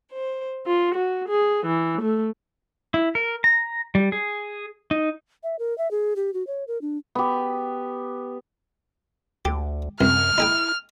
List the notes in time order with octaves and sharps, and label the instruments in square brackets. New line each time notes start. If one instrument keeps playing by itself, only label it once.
[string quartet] C5
F4
F#4
G#4
E3
A3
[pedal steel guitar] E4
A#4
A#5
G3
G#4
D#4
[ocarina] E5
A#4
E5
G#4
G4
F#4
C#5
A#4
D4
[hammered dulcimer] B3 G4
[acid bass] D2 [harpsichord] G4
[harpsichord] C2 [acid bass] F#2 [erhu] F6
[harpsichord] D#4 G#4 G5 [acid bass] E4